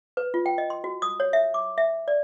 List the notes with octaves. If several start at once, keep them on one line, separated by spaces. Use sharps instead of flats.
B4
F4
G5
D#5
C6
F#4
D#6
C#5
E5
D6
E5
D5